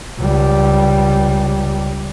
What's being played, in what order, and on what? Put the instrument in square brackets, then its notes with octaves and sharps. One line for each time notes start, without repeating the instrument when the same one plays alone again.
[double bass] C#2 G3